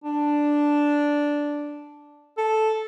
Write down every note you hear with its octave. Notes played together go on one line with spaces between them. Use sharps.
D4
A4